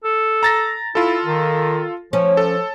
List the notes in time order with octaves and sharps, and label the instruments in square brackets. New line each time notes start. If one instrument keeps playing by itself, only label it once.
[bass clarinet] A4
[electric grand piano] A#5 A6 A#6
[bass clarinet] E4 [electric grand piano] F4 A4
[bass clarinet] D#3
[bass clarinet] F3 [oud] C#4
[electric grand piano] A4